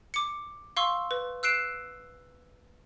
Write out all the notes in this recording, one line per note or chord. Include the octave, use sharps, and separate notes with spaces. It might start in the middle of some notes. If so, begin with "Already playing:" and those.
D6 C#7
F5 C6 C#6 E6
B4
E6 F#6 C7 D7 E7